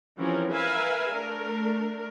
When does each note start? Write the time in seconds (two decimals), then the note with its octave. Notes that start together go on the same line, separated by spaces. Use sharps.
0.19 E3 F3 C4 C#4 G4 A#4
0.49 A#4 B4 E5 F5 G#5
1.12 A3 D4 A#4